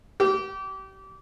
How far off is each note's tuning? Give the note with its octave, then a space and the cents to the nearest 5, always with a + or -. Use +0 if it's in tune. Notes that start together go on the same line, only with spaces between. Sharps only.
G4 -30